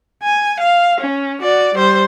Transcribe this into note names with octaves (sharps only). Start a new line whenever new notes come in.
G#5
F5
C#4
F#4 D5
G3 C5